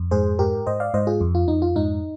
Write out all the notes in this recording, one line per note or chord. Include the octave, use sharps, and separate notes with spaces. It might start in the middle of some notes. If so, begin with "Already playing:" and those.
Already playing: F2
G#2 G#4 C5
G#2 G4 A#4
G#2 C5 D#5
D5 F5
G#2 C5 D#5
F4 G#4
F2
F4
F2 D#4
F4
G#2 D#4